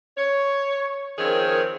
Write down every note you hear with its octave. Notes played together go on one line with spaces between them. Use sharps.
C#5
D#3 F3 C4 G#4 A#4 C#5